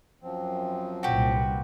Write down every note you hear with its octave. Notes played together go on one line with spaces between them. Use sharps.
F#2 F3 C4
C2 A#2 F#4 G4 B4